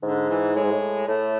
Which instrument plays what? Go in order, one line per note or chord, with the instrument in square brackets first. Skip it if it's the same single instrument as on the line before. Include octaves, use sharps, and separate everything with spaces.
[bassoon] G#2 [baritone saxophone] D3
[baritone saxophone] E3
[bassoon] A2 [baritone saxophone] G#3
[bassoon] G#2
A2
[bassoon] A2 [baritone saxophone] A3